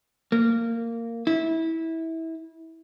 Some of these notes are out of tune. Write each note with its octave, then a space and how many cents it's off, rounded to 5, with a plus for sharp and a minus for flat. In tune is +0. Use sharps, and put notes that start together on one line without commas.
A#3 -15
E4 -20